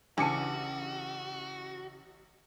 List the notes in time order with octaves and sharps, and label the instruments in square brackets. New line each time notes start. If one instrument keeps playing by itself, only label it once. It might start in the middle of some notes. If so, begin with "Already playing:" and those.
[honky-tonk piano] A1 D6 C#7 [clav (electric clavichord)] C#3 E3 [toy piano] D4 A5 [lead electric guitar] F#4